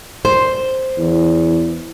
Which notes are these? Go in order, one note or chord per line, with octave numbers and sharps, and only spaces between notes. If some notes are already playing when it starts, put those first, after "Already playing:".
C5
E2